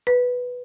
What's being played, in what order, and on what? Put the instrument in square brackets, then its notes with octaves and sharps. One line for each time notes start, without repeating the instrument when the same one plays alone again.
[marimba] B4